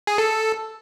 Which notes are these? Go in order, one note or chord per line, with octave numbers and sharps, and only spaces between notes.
G#4
A4